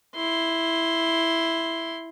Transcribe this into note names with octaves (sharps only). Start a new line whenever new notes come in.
E4 C6